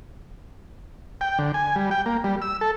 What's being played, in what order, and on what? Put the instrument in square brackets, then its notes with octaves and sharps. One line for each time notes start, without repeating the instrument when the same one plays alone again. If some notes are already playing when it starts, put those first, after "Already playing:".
[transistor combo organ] G5
D3
G#5
G3
G5
A#3
G3
E6
A4